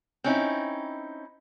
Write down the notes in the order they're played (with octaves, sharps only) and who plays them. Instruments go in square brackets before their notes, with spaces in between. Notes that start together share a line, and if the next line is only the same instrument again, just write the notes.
[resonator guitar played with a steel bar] C4 C#4 D#4 E4